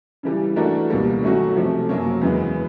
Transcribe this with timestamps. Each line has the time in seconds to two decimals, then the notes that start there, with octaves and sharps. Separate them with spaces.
0.23 C#3 E3 G3
0.56 E3 A3 D4 F#4 A#4
0.90 C#2 B2 G3 A#3
1.23 D#3 F#3 A3 C#4 F#4
1.56 C3 F3 A3
1.89 F#2 C#3 F#3 A#3 C#4
2.22 E2 C#3 E3 G#3 B3